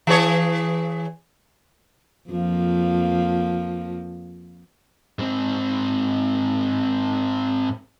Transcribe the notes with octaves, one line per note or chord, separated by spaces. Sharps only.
E3 G#4 C#5
F2 F3 A#3
G#2 C4